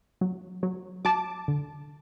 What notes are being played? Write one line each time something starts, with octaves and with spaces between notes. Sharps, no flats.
F#3
F#3
F#3 A5 D6
D3